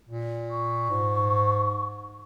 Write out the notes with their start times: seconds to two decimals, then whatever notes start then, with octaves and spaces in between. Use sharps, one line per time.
0.09 A#2
0.51 C#6
0.90 G#2